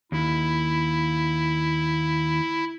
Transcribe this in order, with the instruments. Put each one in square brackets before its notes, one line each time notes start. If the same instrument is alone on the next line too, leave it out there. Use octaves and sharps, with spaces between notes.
[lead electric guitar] D#2 [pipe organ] E4